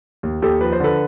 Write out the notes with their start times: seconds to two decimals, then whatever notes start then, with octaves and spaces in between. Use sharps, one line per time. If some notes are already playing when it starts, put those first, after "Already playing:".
0.23 D#2
0.42 D#2 G4 A4
0.61 F3 B4
0.72 C5
0.80 D3 A4 B4